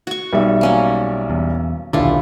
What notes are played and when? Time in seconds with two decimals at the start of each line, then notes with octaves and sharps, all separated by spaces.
0.07 F#4 C#6
0.33 B1 G3 E5
0.61 A#3 C#4 F#4
1.30 E2
1.93 D#1 B1 D3 E4 F4 A4